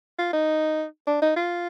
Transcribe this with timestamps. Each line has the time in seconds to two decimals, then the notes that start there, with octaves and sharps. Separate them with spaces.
0.19 F4
0.33 D#4
1.07 D4
1.22 D#4
1.36 F4